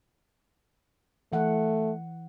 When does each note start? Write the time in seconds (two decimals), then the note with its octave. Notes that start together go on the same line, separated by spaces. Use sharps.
1.33 E3 A3 F#5